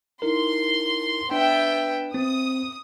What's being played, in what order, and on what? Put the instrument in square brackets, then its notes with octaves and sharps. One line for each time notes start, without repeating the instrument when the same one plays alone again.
[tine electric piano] D#4 E4 A#4 [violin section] C6
[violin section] B3 E5 G5 [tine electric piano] D4
[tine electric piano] C4 [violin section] D#6